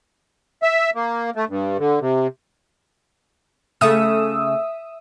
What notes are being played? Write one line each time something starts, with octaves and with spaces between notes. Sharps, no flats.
E5
A#3
A3
G2
D3
C3
C#3 A3 E5 D#6 E6